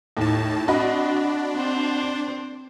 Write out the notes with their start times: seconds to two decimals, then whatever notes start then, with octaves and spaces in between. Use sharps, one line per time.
0.17 D#2 A2 A5
0.68 C4 D4 F#4 D#5 B5
1.55 C4 C5